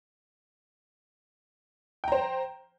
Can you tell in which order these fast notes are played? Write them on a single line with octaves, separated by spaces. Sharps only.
G5 A#5 C5